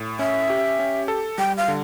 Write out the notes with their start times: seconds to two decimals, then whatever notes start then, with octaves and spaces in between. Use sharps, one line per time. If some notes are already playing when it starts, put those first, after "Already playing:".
Already playing: A2
0.19 C#4 E5
0.50 G4
0.79 C#4
1.08 A4
1.38 G3 G5
1.57 F5
1.68 D3